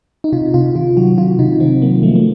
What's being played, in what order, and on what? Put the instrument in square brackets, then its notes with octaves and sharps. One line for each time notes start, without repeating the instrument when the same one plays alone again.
[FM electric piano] D#4
C3 F4
C3 F4
D#3 F4
F#3 F#4
C3 F4
C3 D#4
D#3 C4
F#3 A#3
F3 A3
A#3